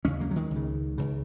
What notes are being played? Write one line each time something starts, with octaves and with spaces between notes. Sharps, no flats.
D#2 C#3 G#3 C#4
F#3 A#3
F#3
D#3 G#3
C#2
C#3
C#2 C#3